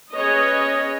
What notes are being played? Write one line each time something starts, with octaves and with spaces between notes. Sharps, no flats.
C#4 G#4 B4 C#5 D#5